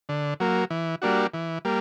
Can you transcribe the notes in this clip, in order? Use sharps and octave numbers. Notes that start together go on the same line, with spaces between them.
D3
F#3 A#3
E3
G3 A#3 D4 F#4
E3
G3 A#3